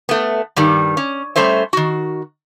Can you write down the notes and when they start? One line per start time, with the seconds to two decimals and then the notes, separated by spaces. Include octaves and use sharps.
0.09 A3 B3
0.56 G2 D#3 G3
0.97 C#4
1.36 G3 A3 C#4 C5 E5
1.73 D#3 F#4